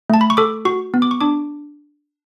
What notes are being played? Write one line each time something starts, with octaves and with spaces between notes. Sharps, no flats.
A3 A5
B5
C#6
A4 D6
F#4 C#6
B3
D6
C#6
D4 D6